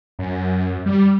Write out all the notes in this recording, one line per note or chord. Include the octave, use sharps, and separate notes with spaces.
F#2
G3